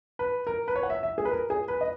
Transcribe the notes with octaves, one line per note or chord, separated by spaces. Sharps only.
B4
A#4
B4
C#5
F#5
E5
E5
G#4
B4
A#4
G#4
B4
D#5